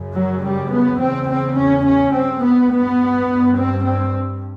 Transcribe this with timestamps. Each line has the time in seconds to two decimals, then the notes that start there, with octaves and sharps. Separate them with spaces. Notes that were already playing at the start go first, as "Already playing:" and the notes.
Already playing: F#2 C#3
0.15 F#3
0.44 G3
0.72 B3
1.00 E2 C#3 C4
1.30 C4
1.57 C#4
1.86 C#4
2.15 G2 C4
2.43 B3
2.72 B3
3.29 G2
3.57 C4
3.86 C4